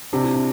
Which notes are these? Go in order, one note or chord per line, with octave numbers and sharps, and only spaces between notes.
C3 D4
E4
D4